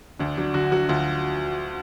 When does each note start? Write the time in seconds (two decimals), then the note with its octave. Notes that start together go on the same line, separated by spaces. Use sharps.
0.19 D2 D4
0.37 F#3 D4
0.54 D3 F#4
0.72 F#3 F#4
0.89 D2 F4